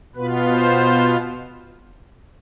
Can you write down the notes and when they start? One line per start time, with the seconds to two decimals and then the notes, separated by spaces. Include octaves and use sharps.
0.15 B2 B3 F4 B4
0.52 C5